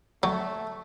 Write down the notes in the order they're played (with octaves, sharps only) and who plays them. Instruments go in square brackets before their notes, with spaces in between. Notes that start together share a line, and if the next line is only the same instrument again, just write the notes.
[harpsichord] F#3 [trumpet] A3